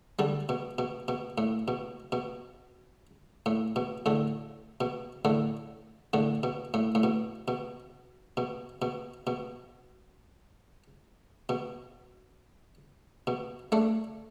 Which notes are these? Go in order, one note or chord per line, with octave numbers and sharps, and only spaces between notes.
D3 G3
B2
B2
B2
A2
B2
B2
A2
B2
A2 D3
B2
A2 D3
A2 D3
B2
A2
A2
B2
B2
B2
B2
B2
B2
B2
A3 D4